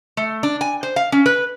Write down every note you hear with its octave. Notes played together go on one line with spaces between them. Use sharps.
A3
D4
G#5
C5
F5
C#4
B4